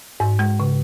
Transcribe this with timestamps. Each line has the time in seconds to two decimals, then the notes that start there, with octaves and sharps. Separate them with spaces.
0.20 G#2
0.39 G#3
0.60 C#3